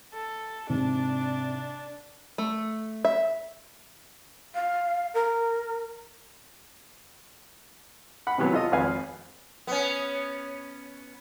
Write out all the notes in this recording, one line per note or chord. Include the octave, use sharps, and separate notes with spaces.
A4
G#2 C3 D4
A3
E5
F5
A#4
F#5 B5
C3 D#3 E3 F#3 B3
F4 A4 D#5
G#1 F2 B4 F5 G#5
B3 C#4